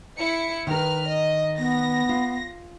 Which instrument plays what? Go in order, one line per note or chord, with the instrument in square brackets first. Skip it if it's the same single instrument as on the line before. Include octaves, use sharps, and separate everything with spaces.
[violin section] E4 C#7
[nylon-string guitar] D#3 A#4 [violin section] B4 F6
[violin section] D#5
[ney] B3 [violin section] A#6
[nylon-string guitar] F4